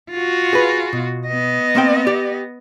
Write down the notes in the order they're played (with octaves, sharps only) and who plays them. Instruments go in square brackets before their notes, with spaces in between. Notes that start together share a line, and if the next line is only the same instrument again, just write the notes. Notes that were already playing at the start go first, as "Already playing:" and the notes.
[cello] F4 F#4
[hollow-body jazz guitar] G#4 B4
B2
[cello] B3 D#5
[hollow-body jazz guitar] A#3 C4 G5
G4